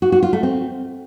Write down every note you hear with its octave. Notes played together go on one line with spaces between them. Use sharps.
F#4
F#4
F4
A3
C4